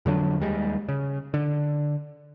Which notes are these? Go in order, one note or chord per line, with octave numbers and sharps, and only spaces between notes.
F2 D3 F#3 D4
D#2 G3 G#3
C#3
D3